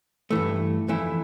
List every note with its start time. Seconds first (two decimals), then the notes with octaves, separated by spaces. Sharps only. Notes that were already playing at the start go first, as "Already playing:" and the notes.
0.30 G2 E3 A3
0.88 F2 E3 A3 E4